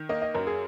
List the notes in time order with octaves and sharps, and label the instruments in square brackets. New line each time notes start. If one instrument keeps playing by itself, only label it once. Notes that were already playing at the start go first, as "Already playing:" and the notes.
Already playing: [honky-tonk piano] D#3
[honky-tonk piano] A#3 [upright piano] D#5
[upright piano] D#5
[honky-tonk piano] F#2 [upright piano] A#4
[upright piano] G#4